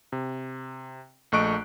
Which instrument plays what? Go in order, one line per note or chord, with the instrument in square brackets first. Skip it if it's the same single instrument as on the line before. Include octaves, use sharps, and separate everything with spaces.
[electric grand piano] C3
A#1 A3 D#5 C#6 F#6 D7